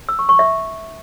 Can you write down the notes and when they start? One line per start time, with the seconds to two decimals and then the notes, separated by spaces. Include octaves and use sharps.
0.09 E6
0.19 C#6
0.29 C#6
0.39 E5